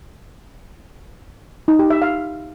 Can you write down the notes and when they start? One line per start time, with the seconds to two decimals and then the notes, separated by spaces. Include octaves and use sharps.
1.68 D#4
1.79 G4
1.90 E5
2.02 F5